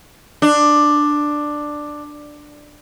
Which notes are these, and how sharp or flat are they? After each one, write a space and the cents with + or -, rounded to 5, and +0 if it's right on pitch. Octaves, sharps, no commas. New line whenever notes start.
D4 +10